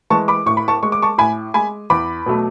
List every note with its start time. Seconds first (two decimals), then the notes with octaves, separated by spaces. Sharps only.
0.10 E3 G#3 A5 C#6
0.28 B5 D6
0.46 A2 C#6
0.57 B5
0.68 A5 C#6
0.83 G#3 C#6
0.92 D6
1.02 A5 C#6
1.18 A2 G#5 B5
1.54 G#3 G#5 B5
1.90 E2 B5 D6
2.26 B2 F#3 A3